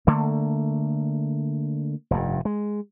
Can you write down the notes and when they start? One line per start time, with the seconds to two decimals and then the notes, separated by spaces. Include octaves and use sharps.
0.07 D3 A3 A#3
2.11 F1 G2
2.45 G#3